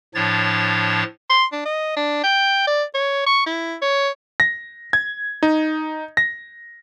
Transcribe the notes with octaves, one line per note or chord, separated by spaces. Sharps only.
A2 F3 D4 C#5 A6
C6
D4
D#5
D4
G5
D5
C#5
C#6
E4
C#5
A#6
G#6
D#4
A#6